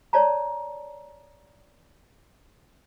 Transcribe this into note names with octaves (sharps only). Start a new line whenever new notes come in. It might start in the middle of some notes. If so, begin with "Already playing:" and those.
C#5 D5 A5 A#5